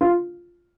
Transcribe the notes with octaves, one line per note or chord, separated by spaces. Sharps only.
F4